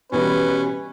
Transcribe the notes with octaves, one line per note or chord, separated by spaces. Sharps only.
B2 E3 G3 C#4 B4